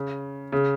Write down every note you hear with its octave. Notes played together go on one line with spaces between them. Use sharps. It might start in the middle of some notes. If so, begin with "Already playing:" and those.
Already playing: C#3
C#3